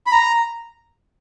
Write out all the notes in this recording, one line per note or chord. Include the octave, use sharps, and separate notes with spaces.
B5
A#5